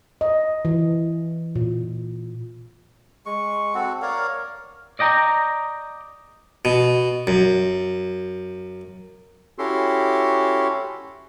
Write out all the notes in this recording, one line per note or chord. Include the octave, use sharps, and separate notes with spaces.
D#5
E3
A#2
G#3 C#6
C4 F#4 A4 F#5
A#4 C#5 D5 F5
D5 D#5 G5 A#5
B2
F#2
C#4 E4 F#4 G4 A4 C6